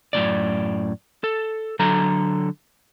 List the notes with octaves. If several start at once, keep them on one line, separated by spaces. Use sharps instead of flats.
F#2 A2 C3 D5
A4
D3 F#3 A4 A#5